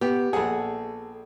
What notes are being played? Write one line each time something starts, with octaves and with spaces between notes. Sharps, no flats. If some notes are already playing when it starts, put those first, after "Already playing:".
B3 G4
A#1 G#4 A4 F#5